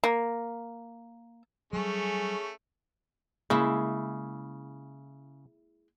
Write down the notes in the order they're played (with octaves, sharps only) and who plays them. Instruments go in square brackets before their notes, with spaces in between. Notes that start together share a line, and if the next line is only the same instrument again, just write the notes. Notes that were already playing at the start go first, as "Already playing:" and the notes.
[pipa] A#3
[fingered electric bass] F#3 G3 [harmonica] A3 C#4 [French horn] G#4
[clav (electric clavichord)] C#3 [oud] G#3 E4 [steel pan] A#3 E5